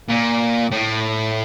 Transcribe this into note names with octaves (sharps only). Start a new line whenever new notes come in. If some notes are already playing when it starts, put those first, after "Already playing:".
A#2
A2